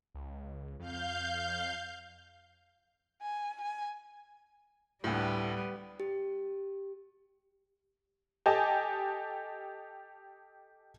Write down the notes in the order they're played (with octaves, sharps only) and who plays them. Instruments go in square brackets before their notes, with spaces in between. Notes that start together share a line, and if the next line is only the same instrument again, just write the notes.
[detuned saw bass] C#2
[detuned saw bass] F2 [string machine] F5 G6
[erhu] G#5
G#5
[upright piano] D2 A2 [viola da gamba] G3 B3
[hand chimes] G4
[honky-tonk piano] G4 A4 D#5 G#5 A5